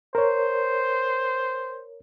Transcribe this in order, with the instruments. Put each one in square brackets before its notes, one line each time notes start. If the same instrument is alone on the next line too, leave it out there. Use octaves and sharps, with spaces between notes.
[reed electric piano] A#4 C#5 [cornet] C5